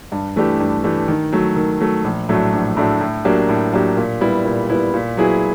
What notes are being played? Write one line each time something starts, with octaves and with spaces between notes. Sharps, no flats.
G2
E3 A3 D4 G4
G2
E3 A3 D4 G4
D#3
F#3 A3
D#3
F#3 A3
A#1
A2 F#3 A3 D4
A#1
A2 F#3 A3 D4
A2
F#3 A#3 D4 G4
A2
F#3 A#3 D4 G4
A#2
G3 B3 E4
A#2
G3 B3 E4
A#2
F#3 B3 E4 G#4